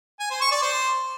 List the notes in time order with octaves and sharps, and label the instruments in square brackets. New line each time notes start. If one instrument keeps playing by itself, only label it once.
[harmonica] G#5
C5
C#6
D5
C5